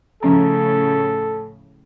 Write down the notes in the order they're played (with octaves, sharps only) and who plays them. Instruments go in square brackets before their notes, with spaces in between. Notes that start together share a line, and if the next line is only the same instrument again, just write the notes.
[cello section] A2 C#3 [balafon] F3 C#4 A#5 [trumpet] A4